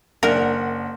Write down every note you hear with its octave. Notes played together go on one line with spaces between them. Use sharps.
F#1 D4 A#4 F#5